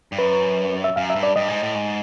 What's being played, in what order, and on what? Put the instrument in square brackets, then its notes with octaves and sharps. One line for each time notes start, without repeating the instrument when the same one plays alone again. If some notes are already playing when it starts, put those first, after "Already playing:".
[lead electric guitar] G2
[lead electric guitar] F#2 [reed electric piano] B4
[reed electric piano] E5
[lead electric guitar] F#2 [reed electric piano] F5
[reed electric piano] E5
[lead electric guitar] G2
[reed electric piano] D5
[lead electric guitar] G2 [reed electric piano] D#5
[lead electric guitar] G#2
A2
G#2